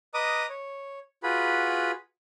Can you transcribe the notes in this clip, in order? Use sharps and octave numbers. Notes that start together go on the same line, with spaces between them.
B4 D#5 A#5 D6 D#6
C#5
F4 F#4 G#4 B4 B5